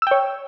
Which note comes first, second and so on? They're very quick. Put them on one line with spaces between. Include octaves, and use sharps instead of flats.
E6 G5 C#5